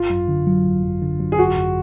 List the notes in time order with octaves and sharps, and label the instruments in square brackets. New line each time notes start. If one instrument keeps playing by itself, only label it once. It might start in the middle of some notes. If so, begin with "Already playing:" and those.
Already playing: [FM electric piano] G#1 [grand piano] F4
[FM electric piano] F#2
D3
F#3
G#1
F#2
D3
F#3
[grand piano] G#4
[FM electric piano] G#1 [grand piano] F#4
[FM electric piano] F#2